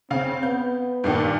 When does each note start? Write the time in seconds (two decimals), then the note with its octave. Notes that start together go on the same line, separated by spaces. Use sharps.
0.11 C#3 C4 F5
0.43 B3 G6
1.04 G2 A#2 D#3